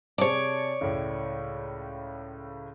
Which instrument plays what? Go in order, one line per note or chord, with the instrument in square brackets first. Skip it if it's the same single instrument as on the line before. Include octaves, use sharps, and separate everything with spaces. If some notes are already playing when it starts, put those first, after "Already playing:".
[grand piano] C3 G#4 A5 [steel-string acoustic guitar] C#5 D5
[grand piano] C#2 A2